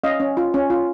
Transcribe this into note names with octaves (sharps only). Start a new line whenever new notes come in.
C#4 D#5 F5
C#4
F4
C#4
F4